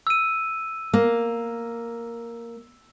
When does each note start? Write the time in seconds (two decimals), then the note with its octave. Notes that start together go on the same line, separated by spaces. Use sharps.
0.07 E6 D#7
0.93 A#3